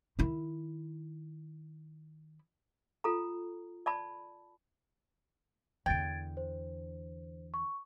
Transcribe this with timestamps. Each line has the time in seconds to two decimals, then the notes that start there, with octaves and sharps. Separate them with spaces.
0.19 D#3 E4
3.04 F4 A4 A#5
3.86 D5 A5 B5
5.86 E2 D3 G5 G#6 A6 D7
6.37 C5
7.54 C#6